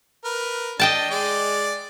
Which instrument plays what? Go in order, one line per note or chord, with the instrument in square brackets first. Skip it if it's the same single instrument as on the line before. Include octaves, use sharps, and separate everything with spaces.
[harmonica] A#4 B4
[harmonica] D4 [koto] D#5 G5 A5
[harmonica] G#3 D5